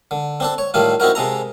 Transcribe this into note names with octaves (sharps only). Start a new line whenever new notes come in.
D3
C4 D4 A4
C#5
A2 D#3 G3 A3 F4
C4 D#4 E4 F#4 A#4
C3 G#3 A4 A#5